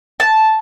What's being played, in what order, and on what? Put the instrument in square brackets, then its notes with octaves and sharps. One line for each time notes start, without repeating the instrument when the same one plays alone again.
[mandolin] A5